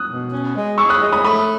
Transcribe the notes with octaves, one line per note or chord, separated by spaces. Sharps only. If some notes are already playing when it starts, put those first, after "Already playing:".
Already playing: D#6 F#6
B2
C#4
G#3
G#4 C#6 E6
D#6 F#6
G#3
B5 D#6
A3 B5 D#6